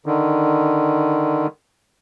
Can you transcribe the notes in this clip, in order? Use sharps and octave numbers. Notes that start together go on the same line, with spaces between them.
D3 D#3